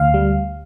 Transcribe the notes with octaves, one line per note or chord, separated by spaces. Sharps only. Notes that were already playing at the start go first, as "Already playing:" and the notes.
Already playing: D2 F5
G3